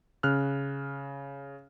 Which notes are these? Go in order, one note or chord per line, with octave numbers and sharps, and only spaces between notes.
C#3 F6 F#6